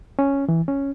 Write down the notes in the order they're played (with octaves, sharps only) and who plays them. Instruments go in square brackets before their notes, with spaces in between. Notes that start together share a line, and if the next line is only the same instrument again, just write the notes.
[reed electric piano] C#4
E3
C#4